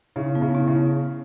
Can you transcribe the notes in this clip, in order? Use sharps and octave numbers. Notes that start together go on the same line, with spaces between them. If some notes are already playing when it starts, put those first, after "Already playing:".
C#3 E4
B3
C#3
E4
C#3
B3